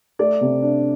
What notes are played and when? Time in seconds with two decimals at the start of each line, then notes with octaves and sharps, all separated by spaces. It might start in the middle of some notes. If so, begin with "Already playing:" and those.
0.19 A3 D5
0.41 C3
0.62 D4